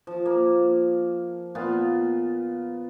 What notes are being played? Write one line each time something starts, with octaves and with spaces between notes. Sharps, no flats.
F3
A#3
A#2 B3 F4